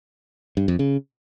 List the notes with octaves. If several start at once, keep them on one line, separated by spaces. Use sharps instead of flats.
G2
F2
C#3